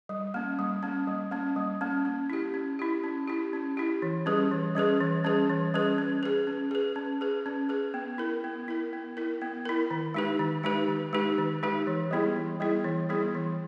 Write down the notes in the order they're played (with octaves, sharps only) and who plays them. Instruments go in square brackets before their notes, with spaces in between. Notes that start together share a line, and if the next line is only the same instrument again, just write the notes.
[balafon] G3
A#3 C#4
G3
A#3 C#4
G3
A#3 C#4
G3
A#3 C#4
C#4
E4 G4
C#4
E4 G4
C#4
E4 G4
C#4
E4 G4
E3
G3 C#4 G#4 B4
E3
G3 C#4 G#4 B4
E3
G3 C#4 G#4 B4
E3
G3 C#4 G#4 B4
C#4
G#4 B4
C#4
G#4 B4
C#4
G#4 B4
C#4
G#4 B4
B3
E4 A#4
B3
E4 A#4
B3
E4 A#4
B3
E4 A#4
D#3
G#3 D#4 G4 B4
D#3
G#3 D#4 G4 B4
D#3
G#3 D#4 G4 B4
D#3
G#3 D#4 G4 B4
E3
G3 B3 E4 G#4
E3
G3 B3 E4 G#4
E3
G3 B3 E4 G#4
E3